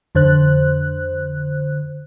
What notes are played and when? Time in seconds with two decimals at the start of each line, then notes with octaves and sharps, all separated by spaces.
0.15 F2 D3 C5 F#6